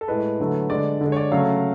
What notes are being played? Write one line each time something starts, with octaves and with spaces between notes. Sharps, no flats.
A4
A2 G#3 B4
D3 F#3 A3
D3 G#3 D5
D3 G#3
C#5
D5
C#3 F#3 A3 F5